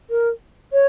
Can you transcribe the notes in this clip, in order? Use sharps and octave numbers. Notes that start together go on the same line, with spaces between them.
A#4
C#5